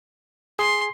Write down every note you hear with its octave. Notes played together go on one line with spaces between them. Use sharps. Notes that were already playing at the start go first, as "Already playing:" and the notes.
G#4 G#5 C6